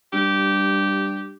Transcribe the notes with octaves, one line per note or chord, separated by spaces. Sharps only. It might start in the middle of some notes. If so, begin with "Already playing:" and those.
G2 G4